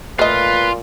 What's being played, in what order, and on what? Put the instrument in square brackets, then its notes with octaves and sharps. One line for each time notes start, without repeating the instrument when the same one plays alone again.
[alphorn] A#2 [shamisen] A3 D#5 [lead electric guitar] F4 [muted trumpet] B4